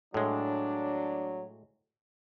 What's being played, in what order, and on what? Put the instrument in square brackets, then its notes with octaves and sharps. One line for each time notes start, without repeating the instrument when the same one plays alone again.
[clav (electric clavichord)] A2 G#3 [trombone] F#3 [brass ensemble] D4